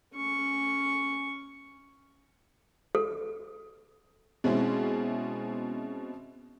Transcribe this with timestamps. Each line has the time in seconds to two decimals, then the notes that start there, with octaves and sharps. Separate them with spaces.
0.15 C#4 C#6
2.95 A4
4.44 B2 G#3 C4 C#4 E4